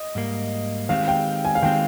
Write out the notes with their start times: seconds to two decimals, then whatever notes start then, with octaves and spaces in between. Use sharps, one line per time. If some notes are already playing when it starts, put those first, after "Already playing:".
Already playing: D#5
0.15 G#2 G3 A#3
0.89 D#3 G#3 C4 G4 F5
1.08 G5
1.45 G#5
1.55 F5
1.62 D#3 G#3 C4 G4 G5